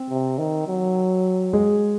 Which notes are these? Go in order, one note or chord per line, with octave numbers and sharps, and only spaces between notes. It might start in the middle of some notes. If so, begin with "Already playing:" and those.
Already playing: C4
C3
D#3
F#3
G#3 G#4